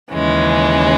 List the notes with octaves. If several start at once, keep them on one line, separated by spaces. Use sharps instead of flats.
D#2 C#3 E3 G#3 C#4